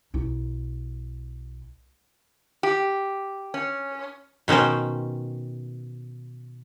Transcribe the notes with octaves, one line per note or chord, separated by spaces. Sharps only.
B1 E4
G4
C#4
B2 D#3 C#4 C5 G5